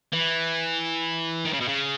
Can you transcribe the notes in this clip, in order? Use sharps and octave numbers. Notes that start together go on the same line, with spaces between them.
E3
D#3
C#3
B2
C#3